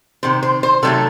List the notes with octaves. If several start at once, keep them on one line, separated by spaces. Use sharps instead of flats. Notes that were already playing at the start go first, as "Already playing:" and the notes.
C3 D#3 C5
C5
C5
C3 D#3 F#3 A3 A4